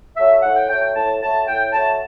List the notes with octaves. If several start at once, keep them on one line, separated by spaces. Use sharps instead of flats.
F#3 A3 E5
A2 F#5
G5
F#3 A3 G5
G5
A2 A5
F#3 A3 A5
A2 G5
F#3 A3 A5